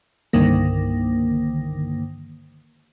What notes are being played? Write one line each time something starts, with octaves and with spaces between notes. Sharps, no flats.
C2 G2 D3 D#3 A#3